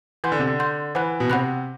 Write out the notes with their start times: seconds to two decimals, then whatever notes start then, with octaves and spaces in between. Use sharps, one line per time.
0.24 E3 F#5 C6 G6
0.32 D3
0.39 C3
0.47 D3
0.59 F#5 C6 G6
0.95 E3 C5 F#5 B5 F#6
1.20 B2
1.30 C3 C5 F#5 B5 F#6